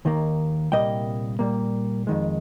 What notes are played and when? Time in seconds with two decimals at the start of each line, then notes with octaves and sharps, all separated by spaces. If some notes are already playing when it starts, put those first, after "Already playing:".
0.05 D#2 D#3 A#3
0.72 C2 A#2 G3 A#3 D#5 G5
1.39 A#2 G3 A#3
2.07 F2 D#3 G#3